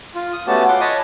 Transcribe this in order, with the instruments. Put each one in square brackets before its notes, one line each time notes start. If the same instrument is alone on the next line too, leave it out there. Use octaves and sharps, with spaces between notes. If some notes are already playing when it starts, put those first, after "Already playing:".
[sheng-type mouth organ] F4
D#6
A3 B3 C#4 F#4 G4 A5
F4 F#5 C6 D6
C#5 D#5 G#5 A5 B5 D#6